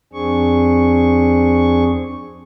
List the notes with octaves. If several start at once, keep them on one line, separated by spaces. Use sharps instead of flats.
F2 C4 D4 G#4 C#6